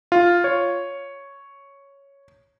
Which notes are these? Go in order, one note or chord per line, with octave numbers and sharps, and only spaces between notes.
F4
C#5